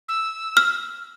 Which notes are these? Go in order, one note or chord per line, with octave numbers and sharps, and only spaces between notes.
E6
F6